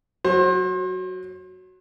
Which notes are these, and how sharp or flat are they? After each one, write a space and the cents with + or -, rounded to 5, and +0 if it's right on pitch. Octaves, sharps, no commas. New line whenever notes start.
F#3 +0 C5 +35